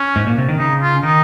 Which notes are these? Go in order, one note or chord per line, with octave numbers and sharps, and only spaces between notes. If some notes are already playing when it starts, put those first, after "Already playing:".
Already playing: C#4
G#2
A#2
C3
D#3
C#3 D#4
F4
D#3 D#4